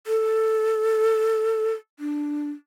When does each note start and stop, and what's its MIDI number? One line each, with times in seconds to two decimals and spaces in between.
0.07 1.73 69
2.00 2.50 62